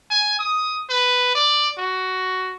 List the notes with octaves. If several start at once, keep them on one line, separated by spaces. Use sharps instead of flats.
G#5
D#6
B4
D5
F#4